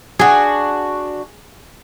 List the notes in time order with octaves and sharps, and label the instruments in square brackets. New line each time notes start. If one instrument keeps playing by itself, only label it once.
[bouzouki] D4 F#4 [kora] G#4